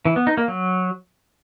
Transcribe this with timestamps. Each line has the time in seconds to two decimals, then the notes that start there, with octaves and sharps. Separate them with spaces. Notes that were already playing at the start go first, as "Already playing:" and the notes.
0.05 E3
0.16 B3
0.27 D#4
0.37 A#3
0.48 F#3